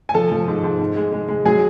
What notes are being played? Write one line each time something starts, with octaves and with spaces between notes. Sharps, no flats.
G#5
F3 A4 A5
F3
G#2
G#2
G#2
G#3
G#3
G#3
F#3 G#4 G#5